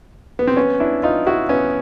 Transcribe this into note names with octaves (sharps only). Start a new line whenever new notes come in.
B3
C4
B3 C#4
D4 E4
D#4 F4
E4 F#4
B3 C#4